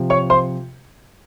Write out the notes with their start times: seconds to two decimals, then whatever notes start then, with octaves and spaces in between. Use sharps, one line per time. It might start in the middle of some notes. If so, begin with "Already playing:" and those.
Already playing: C3 F3
0.10 C#5 C#6
0.30 C5 C6